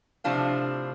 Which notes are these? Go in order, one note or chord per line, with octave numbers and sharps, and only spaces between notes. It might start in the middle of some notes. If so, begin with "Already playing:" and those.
A2 C3 F3 D4 F5